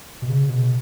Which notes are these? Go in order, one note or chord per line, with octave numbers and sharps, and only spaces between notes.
B2
C#3
B2